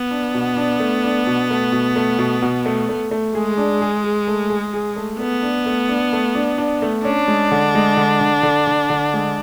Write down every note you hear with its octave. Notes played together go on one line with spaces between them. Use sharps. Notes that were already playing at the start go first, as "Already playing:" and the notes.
Already playing: B3
D4
B2
D4
A3
D4
B2
A3
B2
A3
B2
B2
A3
A3
A3
G#3 G#4
D4
G#4
G#4
A3
G#4
G#4
A3
A3 B3
D4
A3
D4
A3
D4
D4
A3
C#4 D4
G#3
D3
G#3
D3
D3
D3
D3
D3
G#3